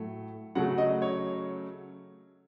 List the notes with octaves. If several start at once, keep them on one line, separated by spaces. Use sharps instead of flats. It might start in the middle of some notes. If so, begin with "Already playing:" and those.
Already playing: A2 F#3 A3
C#3 F#3 A3 F#5
D#5
C#5